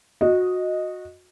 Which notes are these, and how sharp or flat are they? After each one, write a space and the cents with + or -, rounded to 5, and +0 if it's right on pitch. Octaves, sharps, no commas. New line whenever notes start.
F#4 -20 D#5 +0